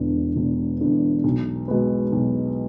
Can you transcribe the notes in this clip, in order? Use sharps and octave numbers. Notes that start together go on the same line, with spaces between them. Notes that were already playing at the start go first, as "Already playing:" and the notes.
Already playing: E1 E2 D3
E1
E2 D3
B1
B2 G#3 B3
B1